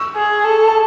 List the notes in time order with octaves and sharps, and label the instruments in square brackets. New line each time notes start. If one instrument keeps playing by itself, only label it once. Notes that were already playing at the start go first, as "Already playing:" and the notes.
Already playing: [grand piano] C#6 E6
[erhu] G#4
A4